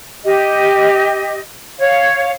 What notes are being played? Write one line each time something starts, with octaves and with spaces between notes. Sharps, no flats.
G4 D#5
C#5 F5